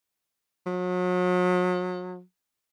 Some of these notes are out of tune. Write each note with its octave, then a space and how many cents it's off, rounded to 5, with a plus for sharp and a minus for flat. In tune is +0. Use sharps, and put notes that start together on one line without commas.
F#3 -40